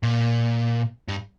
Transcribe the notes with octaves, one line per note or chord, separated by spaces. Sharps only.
A#2
G2